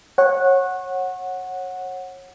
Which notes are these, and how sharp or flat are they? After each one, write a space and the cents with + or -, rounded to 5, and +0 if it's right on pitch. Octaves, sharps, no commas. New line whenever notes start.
C#5 -25 F#5 -5